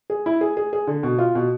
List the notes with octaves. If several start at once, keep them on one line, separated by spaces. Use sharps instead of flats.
G#4
E4
G#4
G#4
G#4
D3
B2
F4
B2